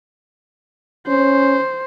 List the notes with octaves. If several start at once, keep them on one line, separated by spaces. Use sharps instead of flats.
C#4 C5